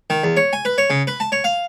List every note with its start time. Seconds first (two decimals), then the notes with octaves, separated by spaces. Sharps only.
0.10 D#3
0.24 E2
0.37 C#5
0.53 G#5
0.65 B4
0.78 C#5
0.90 C#3
1.07 B4
1.20 A5
1.32 C#5
1.44 F5